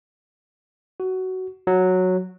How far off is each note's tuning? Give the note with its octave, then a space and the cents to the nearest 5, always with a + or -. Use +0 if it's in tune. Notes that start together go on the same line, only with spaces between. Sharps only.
F#4 +15
F#3 -5